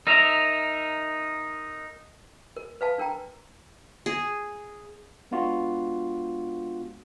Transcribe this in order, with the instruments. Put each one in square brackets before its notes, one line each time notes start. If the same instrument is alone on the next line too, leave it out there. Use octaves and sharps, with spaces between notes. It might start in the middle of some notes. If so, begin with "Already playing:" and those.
[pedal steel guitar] D#4 A#4 E5 A#5
[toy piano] A#4
B4 F5 A5
D4 A#4 G5 A#5
[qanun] G#4
[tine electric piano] G#3 B3 D4 F4 F#4